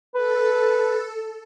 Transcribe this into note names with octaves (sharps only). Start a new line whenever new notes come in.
A4 B4